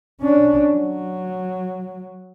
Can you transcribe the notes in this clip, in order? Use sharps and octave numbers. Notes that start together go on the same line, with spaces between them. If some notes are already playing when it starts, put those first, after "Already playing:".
C#4 D4
F#3